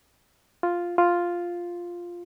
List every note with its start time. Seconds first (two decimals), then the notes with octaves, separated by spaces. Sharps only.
0.63 F4
0.98 F4